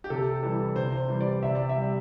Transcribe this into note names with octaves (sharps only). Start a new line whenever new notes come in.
G4
C3 A4
E3 G3 A4
C3 C5
C5
E3 G3
D5
C3 E5
D5
E5
G3